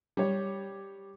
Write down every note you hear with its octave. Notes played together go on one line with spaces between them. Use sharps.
G3 C#5